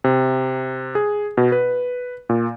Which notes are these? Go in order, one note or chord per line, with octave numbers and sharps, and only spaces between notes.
C3
G#4
B2
B4
A#2